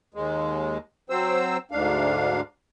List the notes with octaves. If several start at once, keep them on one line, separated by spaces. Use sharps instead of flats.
D#2 G#3
F#3 C4 C5 E6
D2 G#2 D4 F5